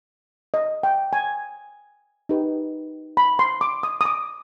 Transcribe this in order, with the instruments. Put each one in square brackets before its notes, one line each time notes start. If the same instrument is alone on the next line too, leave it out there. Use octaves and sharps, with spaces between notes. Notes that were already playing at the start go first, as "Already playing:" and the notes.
[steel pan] D#5
G5
G#5
D#4 G4 B4
B5
C6
D6
D#6
D#6
D6